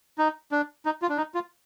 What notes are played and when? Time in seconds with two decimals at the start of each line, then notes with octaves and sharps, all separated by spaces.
0.18 D#4
0.51 D4
0.85 D#4
1.02 F4
1.09 D4
1.17 D#4
1.34 F4